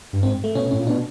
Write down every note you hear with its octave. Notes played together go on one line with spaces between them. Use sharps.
G2
G#2 C4
A3
B2 C#4
A2 C#4
A#2
B2 D4